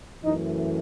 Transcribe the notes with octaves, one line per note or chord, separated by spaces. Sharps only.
F#2 E3 A3 D#4